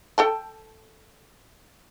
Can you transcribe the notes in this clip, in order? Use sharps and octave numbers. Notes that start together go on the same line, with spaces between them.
A4 G5 A5